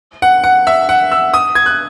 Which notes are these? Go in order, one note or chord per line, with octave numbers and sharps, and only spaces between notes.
F#5
F#5
E5
F#5
E6
D#6
G#6
F#6